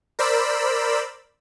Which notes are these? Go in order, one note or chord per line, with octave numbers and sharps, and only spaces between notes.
A#4 C5 D5 B5 E6